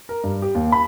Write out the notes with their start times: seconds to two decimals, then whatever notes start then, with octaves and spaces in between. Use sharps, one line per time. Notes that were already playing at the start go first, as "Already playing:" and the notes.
0.09 A#4
0.23 G2
0.42 G4
0.55 D#2
0.72 B5